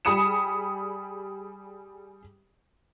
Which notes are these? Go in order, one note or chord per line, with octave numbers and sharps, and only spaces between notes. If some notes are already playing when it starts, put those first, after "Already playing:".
G3 G#4 B5 D#6 C#7 E7